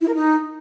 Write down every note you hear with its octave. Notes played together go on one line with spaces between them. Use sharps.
E4
A#4
D#4